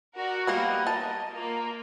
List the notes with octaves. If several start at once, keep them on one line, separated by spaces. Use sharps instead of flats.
F#4 A#4 D5
G3 A#3 B3 A#4 D#5
A5
A#3 F4 A#4